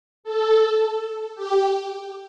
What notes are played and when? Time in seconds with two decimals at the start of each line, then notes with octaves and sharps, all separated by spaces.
0.24 A4
1.35 G4